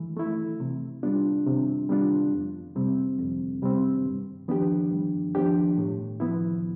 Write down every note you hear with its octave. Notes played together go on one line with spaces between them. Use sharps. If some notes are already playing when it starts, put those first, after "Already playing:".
Already playing: E3 A3 E4
A3 E4
C3
G3 B3 D4 F4
C3
G3 B3 D4 F4
F2
C3 G3 C4
F2
C3 G3 C4
G2
F3 B3 D4 G4
G2
F3 B3 D4 G4
A2
F3 B3 E4